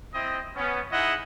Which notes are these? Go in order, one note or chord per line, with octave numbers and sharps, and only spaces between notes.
C4 E4 D#5
B3 C#4
D#4 E4 G#4 D#5 F#5